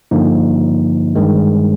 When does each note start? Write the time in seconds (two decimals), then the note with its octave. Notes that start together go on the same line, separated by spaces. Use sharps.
0.11 G2 D3 F3 A#3 D#4
1.15 G2 D#3 G#3